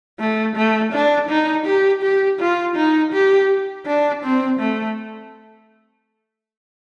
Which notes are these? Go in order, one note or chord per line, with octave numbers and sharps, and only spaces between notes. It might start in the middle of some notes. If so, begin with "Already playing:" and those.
A3
A3
D4
D#4
G4
G4
F4
D#4
G4
D4
C4
A3